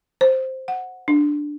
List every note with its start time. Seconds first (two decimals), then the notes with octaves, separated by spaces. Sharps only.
0.21 C5
0.68 F#5
1.08 D4